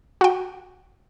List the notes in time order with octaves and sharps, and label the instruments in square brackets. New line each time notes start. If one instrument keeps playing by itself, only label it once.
[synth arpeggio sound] F#4 G5